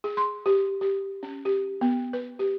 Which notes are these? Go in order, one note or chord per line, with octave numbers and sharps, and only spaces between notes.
G#4
C6
G4
G4
C#4
G4
B3
B4
G4